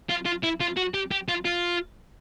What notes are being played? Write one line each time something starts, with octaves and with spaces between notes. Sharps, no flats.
F4
F4
E4
F4
F#4
G4
G4
F4
F4